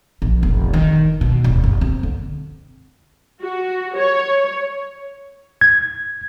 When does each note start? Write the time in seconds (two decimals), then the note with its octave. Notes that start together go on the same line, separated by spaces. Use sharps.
0.22 A#1
0.43 F1
0.74 D#3
1.21 B2
1.44 D1
1.64 F#1
1.81 C4
2.03 D3
3.42 F#4
3.96 C#5
5.61 G#6